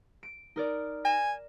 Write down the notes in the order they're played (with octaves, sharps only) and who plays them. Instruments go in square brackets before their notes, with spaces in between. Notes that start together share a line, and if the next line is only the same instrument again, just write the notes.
[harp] D7
D#4 A#4 D5
[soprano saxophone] G#5 [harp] A#6 E7